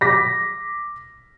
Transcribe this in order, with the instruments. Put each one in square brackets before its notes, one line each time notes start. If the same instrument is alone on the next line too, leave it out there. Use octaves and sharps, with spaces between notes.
[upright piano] D6 A#6 B6